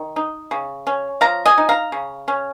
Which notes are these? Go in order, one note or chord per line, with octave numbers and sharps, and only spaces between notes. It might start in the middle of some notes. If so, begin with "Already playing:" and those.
Already playing: D#3
D#4
C#3
C#4
F3 F5 A#5
D#5 G#5
D#4
F5 A#5
C#3
C#4